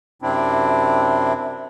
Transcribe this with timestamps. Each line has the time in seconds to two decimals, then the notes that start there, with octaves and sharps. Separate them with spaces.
0.22 F#2 C3 C4 D4 E4